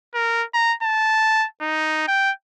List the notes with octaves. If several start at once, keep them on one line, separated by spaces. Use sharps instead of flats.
A#4
A#5
A5
D#4
G5